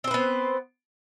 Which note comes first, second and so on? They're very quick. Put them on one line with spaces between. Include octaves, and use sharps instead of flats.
C4 C5 B4 B3